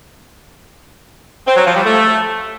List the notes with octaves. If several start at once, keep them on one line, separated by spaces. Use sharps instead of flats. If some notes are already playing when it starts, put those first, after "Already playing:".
C4
F#3
F3
G3
A3